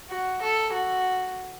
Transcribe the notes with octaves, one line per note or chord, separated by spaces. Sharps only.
F#4
A4
F#4